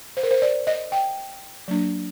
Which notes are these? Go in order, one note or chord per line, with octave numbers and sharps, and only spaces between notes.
C5
A#4
C5
D5
D#5
G5
F#3 A#3 D4